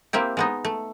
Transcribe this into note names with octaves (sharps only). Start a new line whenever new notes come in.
A#3 C4 E4 G4
G#3 B3 D#4
A3